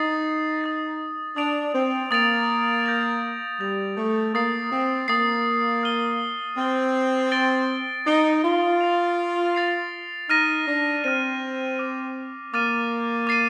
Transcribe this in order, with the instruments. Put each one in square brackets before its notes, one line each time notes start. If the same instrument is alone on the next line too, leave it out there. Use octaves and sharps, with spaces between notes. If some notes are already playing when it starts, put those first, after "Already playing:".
Already playing: [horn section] D#4 [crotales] D#6 A6 C7
[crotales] D#6 A6 C7
[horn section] D4 [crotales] D#6 A6 D7 F7
[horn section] C4
[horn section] A#3 [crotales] D#6 A6 D7 F7
[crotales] G6 A#6 F7
[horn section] G3 [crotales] G6 A#6 F7
[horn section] A3
[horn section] A#3 [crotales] D#6 A6 C7
[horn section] C4
[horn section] A#3 [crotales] D#6 A6 C7
[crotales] F6 A6 D#7 G7
[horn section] C4 [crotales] F6 A6 D#7 G7
[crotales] A6 D7 G7
[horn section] D#4 [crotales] A6 D7 G7
[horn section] F4
[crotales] A6 C7 F7
A6 C7 F7
[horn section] D#4 [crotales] F6 A#6 D#7
[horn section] D4
[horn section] C4 [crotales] F6 A#6 D#7
[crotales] D6 F6 A6 D#7
[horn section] A#3 [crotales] D6 F6 A6 D#7
[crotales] D6 A6 C7 D#7